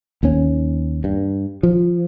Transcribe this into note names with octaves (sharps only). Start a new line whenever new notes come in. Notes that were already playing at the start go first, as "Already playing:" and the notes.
D#2 C#4
G2
F3